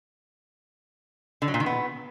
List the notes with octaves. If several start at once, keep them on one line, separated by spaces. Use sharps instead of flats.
D3
F#3
A#2
D#3
B3